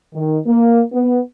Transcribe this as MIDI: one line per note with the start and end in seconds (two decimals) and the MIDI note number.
0.14 0.37 51
0.47 0.81 58
0.92 1.17 59